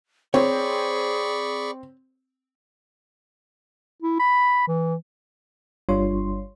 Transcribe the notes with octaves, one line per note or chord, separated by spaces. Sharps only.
C4 G#4 C#5 D5 B5 C#6
E4
B5
E3
G1 G3 D4 F4 C#5 C6